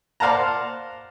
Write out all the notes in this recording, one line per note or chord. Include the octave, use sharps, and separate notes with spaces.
C5 D5 F5 F#5 A5 A#5